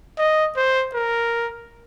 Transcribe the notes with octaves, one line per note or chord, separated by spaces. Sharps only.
D#5
C5
A#4